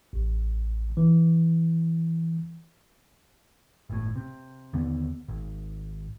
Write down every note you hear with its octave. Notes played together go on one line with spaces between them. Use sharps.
A1
E3
G1 A2
C3
D#2 D3 B3
G#1